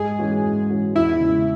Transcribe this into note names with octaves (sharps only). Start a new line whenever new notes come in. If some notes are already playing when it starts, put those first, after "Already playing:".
Already playing: G#2 G#4
E3 G#3 C#4 F#4
G#2
E3 G#3 C#4 F#4
E2 E4
C#3 G#3